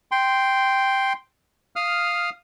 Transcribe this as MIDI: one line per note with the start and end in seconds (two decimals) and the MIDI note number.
0.11 1.13 79
0.11 1.13 84
1.76 2.30 77
1.76 2.30 87
1.76 2.30 89